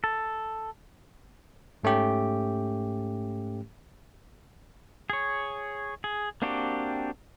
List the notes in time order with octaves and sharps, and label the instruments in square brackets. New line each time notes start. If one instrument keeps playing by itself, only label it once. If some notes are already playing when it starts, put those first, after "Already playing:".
[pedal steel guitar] A4
[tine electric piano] G#2 A3 C#4 G4
[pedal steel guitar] G#4 C#5
G#4
A#3 C4 D4 F#4 G4